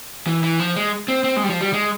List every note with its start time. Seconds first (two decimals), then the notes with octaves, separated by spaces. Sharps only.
0.27 E3
0.43 E3
0.60 F3
0.76 G#3
1.08 C4
1.24 C4
1.37 G#3
1.43 G3
1.49 F3
1.61 G3
1.73 G#3